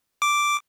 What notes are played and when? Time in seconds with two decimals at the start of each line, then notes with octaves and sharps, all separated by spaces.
0.22 D6